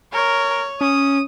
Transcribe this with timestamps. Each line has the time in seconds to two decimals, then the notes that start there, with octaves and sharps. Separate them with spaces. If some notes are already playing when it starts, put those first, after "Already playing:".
0.13 A#4 C#5
0.81 C#4 D#6